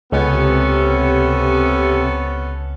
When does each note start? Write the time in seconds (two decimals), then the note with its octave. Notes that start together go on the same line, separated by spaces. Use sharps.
0.12 C#2 C3 B3 C#4 A4